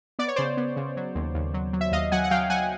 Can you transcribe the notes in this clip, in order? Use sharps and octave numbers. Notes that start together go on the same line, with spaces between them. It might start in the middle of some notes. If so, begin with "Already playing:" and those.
B3 D5
C#5
C#3 C5 D5
B3
C#3
F#3
D#2
D#2
F#3
F#3
E5
D#2 D#5 F5
F#3 F#5 G#5
F#5
F#3 F5 G5
F#3 F#5 G#5